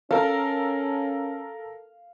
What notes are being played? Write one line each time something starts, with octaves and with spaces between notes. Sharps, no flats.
C#4 A4 A#4 F5